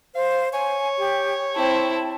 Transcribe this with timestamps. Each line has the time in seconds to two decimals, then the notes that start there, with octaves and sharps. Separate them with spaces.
0.15 C5 F5
0.53 C#5 G#5
0.98 G4
1.55 C4 E4 A5